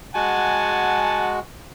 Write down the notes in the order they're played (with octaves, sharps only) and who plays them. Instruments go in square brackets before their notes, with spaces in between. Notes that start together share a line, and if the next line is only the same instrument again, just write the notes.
[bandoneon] G#3 F#4 [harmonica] F#5 G#5 A5